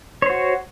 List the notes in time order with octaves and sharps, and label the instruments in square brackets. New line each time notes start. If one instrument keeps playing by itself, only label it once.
[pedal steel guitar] C#5
C5
F#4